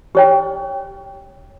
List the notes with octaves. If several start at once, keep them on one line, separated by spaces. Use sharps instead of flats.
G4 C#5 G5